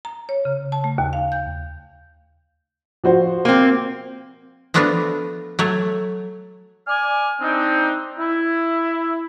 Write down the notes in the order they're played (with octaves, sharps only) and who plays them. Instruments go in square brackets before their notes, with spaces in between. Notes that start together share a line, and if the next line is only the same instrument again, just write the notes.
[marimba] A#5
C#5
C#3
A5
A3
D#2
F5
G6
[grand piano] F3 F#4 C5
[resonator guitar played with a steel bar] A#3 C4
[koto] F3 A3 B3 D4 F4 F#4
F#3 A3 C#5
[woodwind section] D5 G#5 F6
C4 D4 D#4
E4